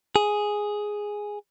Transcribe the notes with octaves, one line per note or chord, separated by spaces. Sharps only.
G#4